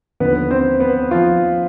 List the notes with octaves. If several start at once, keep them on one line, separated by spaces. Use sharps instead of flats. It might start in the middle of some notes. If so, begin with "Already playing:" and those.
D#2 D3 F3 B3 B4
C4 C5
B3 B4
F3 F4